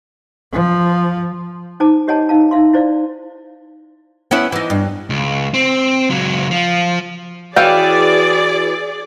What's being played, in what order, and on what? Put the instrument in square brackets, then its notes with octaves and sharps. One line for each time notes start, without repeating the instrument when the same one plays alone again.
[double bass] F3
[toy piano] D#4 C5 G#5 A5 D6
G4 C#5 D#5 F#5 G#5 A5
D#4 F5 A5
D#4 E5 F5 C6
E4 C5 D5 F5
[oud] B3 C#4 E4
E3 D#4
G2
[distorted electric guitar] C#2
C4
C#2 F#3
F3
[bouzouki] E3 [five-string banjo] C#4 F5 G5 [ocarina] F#4 [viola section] G#4 D5